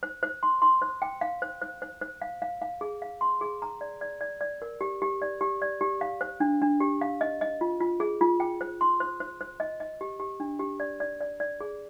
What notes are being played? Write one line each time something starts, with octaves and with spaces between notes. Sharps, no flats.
C5
C5
C6
C6
C5
G5
F5
C5
C5
C5
C5
F5
F5
F5
G#4
F5
C6
G#4
A#5
D5
D5
D5
D5
A#4
G4
G4
D5
G4
D5
G4
F5
C5
D4
D4
G4
F5
D#5
D#5
F4
F4
G#4
F4
G5
C5
C6
C5
C5
C5
D#5
D#5
G4
G4
D4
G4
D5
D5
D5
D5
G#4